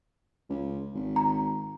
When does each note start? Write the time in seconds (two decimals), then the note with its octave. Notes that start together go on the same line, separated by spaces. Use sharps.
0.50 C#2
0.94 G#1
1.16 A#5